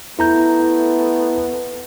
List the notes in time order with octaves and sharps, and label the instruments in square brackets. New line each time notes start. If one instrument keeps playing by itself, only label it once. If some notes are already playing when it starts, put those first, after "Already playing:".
[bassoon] A3 [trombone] B3 [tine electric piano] E4 A#5 G6